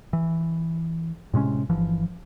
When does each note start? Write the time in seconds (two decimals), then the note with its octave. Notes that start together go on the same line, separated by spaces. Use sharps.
0.13 E3
1.34 A2 C3 G#3 C#4
1.69 G1 E3 F3